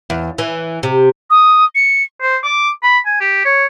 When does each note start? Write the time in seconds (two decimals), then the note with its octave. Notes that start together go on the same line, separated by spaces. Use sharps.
0.10 E2
0.38 E3
0.83 C3
1.30 D#6
1.75 C#7
2.22 C5
2.43 D6
2.83 B5
3.06 G#5
3.21 G4
3.45 C#5